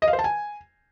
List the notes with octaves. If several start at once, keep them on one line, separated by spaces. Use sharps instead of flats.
D#5
F5
C5
A5
G#5